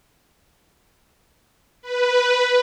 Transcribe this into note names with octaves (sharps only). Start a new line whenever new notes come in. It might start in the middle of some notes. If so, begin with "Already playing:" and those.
B4